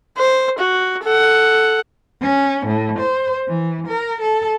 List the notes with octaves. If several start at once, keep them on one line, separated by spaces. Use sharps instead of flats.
C5
F#4
A4 F#5
C#4
A2
C5
E3
A#4
A4